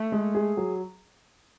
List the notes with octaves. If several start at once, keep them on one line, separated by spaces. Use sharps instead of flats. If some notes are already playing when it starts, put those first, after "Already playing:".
Already playing: A3
G#3
G#4
F#3